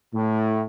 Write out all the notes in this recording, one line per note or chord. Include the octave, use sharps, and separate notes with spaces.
A2